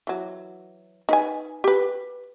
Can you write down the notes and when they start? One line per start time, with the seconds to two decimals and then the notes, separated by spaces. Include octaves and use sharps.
0.07 E3 F#3
1.09 D#4 B4 G#5
1.64 G4 B4